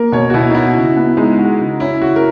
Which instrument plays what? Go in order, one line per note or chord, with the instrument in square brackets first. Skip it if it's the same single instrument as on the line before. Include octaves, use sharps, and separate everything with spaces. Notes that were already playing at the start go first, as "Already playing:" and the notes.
Already playing: [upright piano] A#3 [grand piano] A#4
[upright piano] B2 [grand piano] C#5
[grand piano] F#4
[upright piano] B2 [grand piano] E4
[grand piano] D#4
[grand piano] E4 [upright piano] F#4
[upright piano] C#3
B3
[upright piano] G#3 [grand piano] D#4
[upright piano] F#4
C#3
[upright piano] C#4 [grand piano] E4
[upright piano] C#3 [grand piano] F#4
[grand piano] A#4